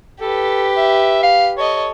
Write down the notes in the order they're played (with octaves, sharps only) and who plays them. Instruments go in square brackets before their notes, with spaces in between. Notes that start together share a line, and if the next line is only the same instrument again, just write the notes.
[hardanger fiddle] G4 B4 [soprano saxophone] A4
[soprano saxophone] E5
F5
[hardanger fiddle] A4 D#5 [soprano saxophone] C#5